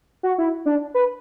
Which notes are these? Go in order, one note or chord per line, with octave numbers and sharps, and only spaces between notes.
F#4
E4
D4
B4